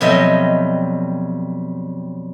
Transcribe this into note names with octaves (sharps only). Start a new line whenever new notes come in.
F2 B2 F#3 G3 D#5 E5